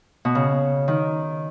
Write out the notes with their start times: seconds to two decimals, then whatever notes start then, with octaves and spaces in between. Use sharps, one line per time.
0.25 B2
0.35 C#3
0.88 D#3